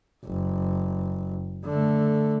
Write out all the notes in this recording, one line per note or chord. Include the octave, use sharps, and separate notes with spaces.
F#1
D3 A3